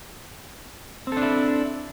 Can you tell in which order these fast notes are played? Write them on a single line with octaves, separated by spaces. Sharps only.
C4 A4 D4 E4